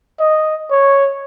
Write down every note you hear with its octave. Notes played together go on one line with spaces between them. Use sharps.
D#5
C#5